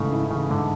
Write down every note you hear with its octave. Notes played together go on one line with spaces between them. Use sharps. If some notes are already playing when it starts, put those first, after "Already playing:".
Already playing: G#2 C#3 E3 A3
E4
C#3 E3
G#2 D3